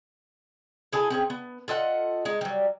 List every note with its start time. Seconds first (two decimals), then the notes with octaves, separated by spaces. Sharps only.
0.93 E4 G#4 A4 G#5
1.10 C4 C#4 G#4
1.30 B3
1.68 F4 A4 D#5 F#5
2.25 G#3 D#4
2.41 F#3 G3